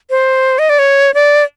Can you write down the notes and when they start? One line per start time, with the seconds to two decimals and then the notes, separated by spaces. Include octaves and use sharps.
0.10 C5
0.59 D#5
0.70 D5
0.79 C#5
1.14 D5